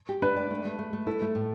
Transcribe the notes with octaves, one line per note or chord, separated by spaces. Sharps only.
G4
D4 B4
D5
A3
A3
A3
A3
E4 A4
A3
A2